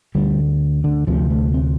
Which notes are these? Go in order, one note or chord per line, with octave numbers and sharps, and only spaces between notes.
D2 D3 G3
D3
D2 C3 F3
A3
C4